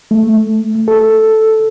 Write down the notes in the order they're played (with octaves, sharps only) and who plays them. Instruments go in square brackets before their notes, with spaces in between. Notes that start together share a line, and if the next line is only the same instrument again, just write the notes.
[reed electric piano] A3
A4